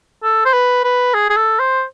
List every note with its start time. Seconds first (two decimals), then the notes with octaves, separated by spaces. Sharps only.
0.23 A4
0.45 C5
0.53 B4
0.84 B4
1.14 G#4
1.30 G#4
1.37 A4
1.59 C5